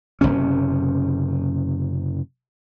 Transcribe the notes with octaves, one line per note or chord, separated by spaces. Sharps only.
F#1 C#2 C3 C#4